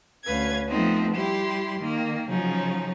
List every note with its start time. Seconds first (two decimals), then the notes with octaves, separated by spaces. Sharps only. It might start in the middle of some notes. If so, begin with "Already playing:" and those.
0.25 D2 C#4 B4 F5 G#6
0.68 F3 A3 B3 C4 D#4
1.15 G3 E4 G4 C6
1.79 D#3 A#3
2.28 C#3 F3 F#3 C#4 D#4